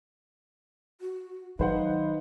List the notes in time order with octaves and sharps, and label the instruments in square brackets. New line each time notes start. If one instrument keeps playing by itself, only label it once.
[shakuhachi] F#4
[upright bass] D#3 F#3 [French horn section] D#4 [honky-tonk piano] B4 C5 F#5 [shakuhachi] F5